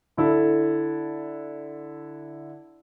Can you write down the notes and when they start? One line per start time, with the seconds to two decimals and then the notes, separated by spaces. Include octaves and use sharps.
0.17 D3 E4 A4